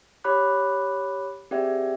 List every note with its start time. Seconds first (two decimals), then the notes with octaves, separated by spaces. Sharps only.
0.24 G4 C#5 B5 D6 F#6
1.51 C4 G4 G#4 D5 E5 G5